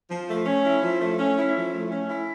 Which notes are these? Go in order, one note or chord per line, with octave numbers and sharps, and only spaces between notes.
F3
A3
C#4
E4
F3
A3
C#4
E4
F3
A3
C#4
E4